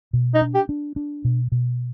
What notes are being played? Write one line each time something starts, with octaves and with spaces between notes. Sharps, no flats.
B2
D#4
D4
G4
D4
D4
B2
B2